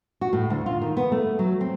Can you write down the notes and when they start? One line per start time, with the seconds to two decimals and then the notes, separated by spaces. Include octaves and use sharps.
0.21 F#4
0.33 A2
0.50 D2
0.66 F4
0.81 D#3
0.97 B3
1.12 A3
1.39 F#3
1.61 C4